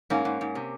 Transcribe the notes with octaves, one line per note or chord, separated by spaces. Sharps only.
G#2 A#3 C#4
G#2
G#2
C3